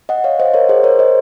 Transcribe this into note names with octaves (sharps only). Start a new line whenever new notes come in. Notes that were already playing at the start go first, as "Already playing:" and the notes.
D#5 F#5
C#5 F5
C5 D#5
A#4 C#5
G#4 C5
A#4 C#5
C5 D#5